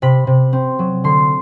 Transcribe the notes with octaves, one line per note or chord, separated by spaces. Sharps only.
C3 B5
C3
C4
F#3
D3 C6